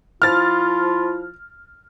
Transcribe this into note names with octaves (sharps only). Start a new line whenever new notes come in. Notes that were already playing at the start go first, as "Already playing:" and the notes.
F3 E4 F4 F6 A6